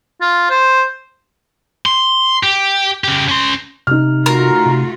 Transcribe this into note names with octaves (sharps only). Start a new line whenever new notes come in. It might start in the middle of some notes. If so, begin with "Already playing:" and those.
F4
C5
C6
G4
C#3 G4
C#4 C6
C3 D#4 F6
A3 F4 F#4 A#4
C3